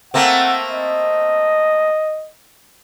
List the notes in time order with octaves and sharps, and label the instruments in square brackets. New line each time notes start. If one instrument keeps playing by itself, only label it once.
[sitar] A3 A#3 C4 [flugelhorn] F#5
[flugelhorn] D#5